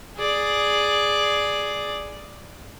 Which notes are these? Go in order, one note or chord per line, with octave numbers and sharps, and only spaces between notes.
G#4 D5